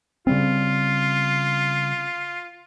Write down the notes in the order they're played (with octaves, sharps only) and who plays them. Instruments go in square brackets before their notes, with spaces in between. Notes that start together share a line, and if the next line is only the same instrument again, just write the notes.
[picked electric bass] C#3 G3 C4 [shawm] F4